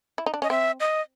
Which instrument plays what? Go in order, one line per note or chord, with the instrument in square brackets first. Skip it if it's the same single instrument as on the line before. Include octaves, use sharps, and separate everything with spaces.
[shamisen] E4
D#4
D4
[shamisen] C#4 [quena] D#5
[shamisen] C4 [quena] E5
[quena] D#5